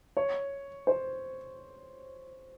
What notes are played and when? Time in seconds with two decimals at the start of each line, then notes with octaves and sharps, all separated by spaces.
0.17 C#5
0.87 C5